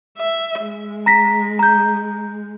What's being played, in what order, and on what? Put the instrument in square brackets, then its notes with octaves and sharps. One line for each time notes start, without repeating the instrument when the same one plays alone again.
[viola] E5
G#3
[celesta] A#5 A#6 B6
A#5 G6